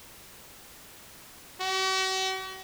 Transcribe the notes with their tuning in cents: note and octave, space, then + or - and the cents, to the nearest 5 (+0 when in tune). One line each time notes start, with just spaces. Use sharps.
F#4 +45